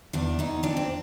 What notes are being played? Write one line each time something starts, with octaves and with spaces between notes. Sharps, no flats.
E2 D4
E2 D#4
F2 D4
C4